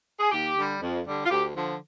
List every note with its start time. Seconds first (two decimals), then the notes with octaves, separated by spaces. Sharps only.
0.20 G#4
0.31 D#2 G4
0.56 D3 G3
0.80 F2
1.05 D3 G3
1.25 F4
1.30 D2 G4
1.55 D3 F3